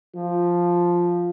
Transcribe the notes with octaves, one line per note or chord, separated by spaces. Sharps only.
F3